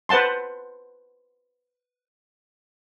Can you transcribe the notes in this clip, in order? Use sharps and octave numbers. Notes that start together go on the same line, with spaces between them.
B4 C5 F#5 A5 C6